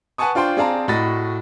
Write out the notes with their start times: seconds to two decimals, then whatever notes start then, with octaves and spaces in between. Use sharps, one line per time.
0.18 B4 F#5 G#5 A5 C#6 D#6
0.35 D4 F4 C5 G5 C6
0.57 C4 G#4 D5 F5 A5 A#5
0.88 A2 F#4 D#5 B5 A6